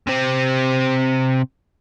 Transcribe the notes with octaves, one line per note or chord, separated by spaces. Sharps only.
C3 C4